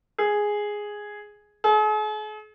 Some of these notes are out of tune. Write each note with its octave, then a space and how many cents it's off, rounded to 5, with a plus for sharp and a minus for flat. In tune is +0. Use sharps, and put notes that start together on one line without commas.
G#4 +0
G#4 +45